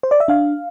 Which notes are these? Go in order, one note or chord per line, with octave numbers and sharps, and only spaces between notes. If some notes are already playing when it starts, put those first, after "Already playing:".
C5
D5
E5
D4 F5